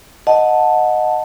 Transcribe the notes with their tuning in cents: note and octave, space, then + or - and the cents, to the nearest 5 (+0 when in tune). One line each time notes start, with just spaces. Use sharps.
D#5 +0 F#5 -25 A5 +0